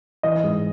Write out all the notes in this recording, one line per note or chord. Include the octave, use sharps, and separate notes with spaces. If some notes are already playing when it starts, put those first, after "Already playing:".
E3 D#5
G#2